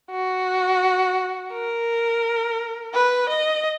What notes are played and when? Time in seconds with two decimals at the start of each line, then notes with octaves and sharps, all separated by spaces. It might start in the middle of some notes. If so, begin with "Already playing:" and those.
0.11 F#4
1.52 A#4
2.94 B4
3.29 D#5